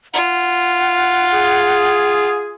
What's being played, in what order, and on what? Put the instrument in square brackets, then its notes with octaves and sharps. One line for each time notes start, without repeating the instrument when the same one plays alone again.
[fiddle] F4 [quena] F#5
[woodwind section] G#4